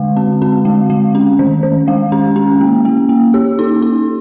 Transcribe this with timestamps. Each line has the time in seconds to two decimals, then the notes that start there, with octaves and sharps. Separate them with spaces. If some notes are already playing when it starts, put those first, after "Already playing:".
Already playing: D3 G#3
0.17 C4
0.42 C4
0.65 G#3
0.90 G#3
1.15 C#4
1.39 D#3
1.63 D#3
1.88 G#3
2.12 C#4
2.36 C#4
2.61 A#3
2.85 A#3
3.09 A#3
3.34 G4
3.59 D#4
3.82 D#4